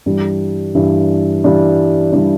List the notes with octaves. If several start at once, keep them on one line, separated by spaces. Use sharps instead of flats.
G2 E3 G3 D4
G2 E3 G3 D4
G2 E3 G3 D4
E3 G3 D4